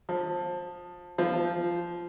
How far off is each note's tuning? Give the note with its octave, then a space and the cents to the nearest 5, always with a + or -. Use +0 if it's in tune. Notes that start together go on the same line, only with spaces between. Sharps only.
F3 +20
F3 -10